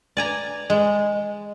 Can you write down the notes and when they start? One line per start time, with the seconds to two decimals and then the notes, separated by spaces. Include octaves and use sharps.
0.17 D5 G#5 A#5
0.70 G#3